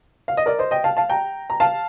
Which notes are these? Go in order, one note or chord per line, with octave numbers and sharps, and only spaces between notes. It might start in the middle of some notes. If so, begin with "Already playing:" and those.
F5
D#5
A#4 D5
C5 D#5
D#5 G5
F5 A5
F5 A5
G5 A#5
A#5
F5 A5